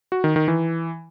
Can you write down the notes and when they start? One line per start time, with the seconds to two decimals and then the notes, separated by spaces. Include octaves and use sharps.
0.12 F#4
0.24 D#3
0.36 D#3
0.48 E3